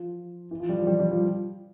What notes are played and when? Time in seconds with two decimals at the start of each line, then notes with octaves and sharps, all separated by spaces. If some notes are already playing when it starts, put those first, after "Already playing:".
Already playing: F3
0.51 E3
0.60 F3
0.69 G3
0.78 F3
0.87 G3
0.99 G3
1.11 F3